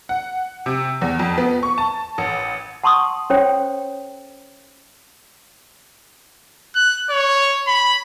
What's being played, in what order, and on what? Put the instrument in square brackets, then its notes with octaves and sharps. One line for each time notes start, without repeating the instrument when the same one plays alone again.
[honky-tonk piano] F#5
C3
E2
F2
B3
C#6
A5
A1
[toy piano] F#5 A5 C6 C#6 D#6
C#4 A4 C5 C#5 G5
[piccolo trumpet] F#6
C#5
B5